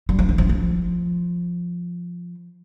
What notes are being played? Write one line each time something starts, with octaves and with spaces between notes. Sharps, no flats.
G3
F3
E3
F3
F3